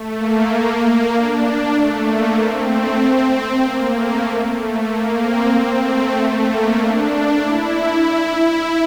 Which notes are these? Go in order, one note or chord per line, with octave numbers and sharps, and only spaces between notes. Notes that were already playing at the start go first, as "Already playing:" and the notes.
Already playing: A3
A#3
D4
A3
A#3
C4
A3
C4
A#3
A3
A3
A#3
C4
C4
A3
A3
A#3
D4
E4